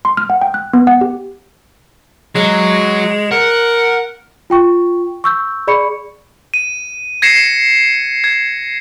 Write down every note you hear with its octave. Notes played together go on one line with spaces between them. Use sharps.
C6
F6
F#5
G5
F#6
B3
F#5
G4
F#3 G#3
A#4 F#5
F4 G5 C#6
C#6 E6 G6
G#4 D5 B5 C#6 C#7
D#7
G#6 A#6 C7 C#7 E7
G#6